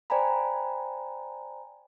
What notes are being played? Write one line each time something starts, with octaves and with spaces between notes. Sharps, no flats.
C5 D5 G5 G#5 A#5 B5